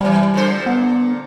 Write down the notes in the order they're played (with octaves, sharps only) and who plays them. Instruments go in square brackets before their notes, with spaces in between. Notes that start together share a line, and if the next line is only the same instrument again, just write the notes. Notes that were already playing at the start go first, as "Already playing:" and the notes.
[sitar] B2 E3 [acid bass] G3
[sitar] A#2 D3 C5
[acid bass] B3